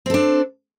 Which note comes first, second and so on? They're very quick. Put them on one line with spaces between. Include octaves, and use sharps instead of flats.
C4 A4 D4